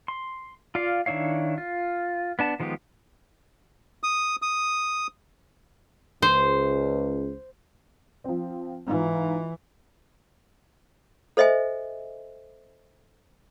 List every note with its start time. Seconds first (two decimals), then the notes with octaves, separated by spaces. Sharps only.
0.08 C6
0.75 F4 D5 F5
1.06 D#3 D4 E4 C#5 F5
1.58 F4
2.39 B3 D4 A5
2.60 D#3 F3 G#3 B3 G4
4.03 D#6
4.42 D#6
6.22 C#2 C5
8.24 F3 C4
8.87 G#2 E3 F4
11.37 A4 C5 D#5 E5 G#5